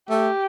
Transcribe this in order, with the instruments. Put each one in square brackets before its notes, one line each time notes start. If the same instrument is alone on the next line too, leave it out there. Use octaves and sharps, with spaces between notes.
[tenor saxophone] A3 [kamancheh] G4